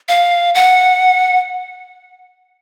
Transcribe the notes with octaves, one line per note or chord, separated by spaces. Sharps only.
F5
F#5